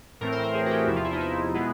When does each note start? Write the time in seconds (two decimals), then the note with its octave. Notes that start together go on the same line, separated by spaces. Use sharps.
0.21 A2 E3 A3 C4 A#4
0.32 C5
0.44 A#4
0.54 G#4
0.66 F#4
0.70 G4
0.87 E2 C3 F3 E4
0.96 F4
1.04 E4
1.12 D#4
1.21 E4
1.54 B2 G#3 B3